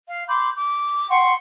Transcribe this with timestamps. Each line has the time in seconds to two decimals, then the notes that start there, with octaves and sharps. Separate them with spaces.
0.08 F5
0.28 B5 C6 D6 G6
0.55 D6
1.09 F#5 G5 C6 C#6